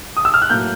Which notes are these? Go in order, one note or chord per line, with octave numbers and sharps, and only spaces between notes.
D#6
E6
F6
F#6
A2 F#3 A#3 G6